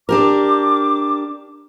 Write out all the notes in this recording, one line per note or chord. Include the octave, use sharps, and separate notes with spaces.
D4 G4 A#4 D6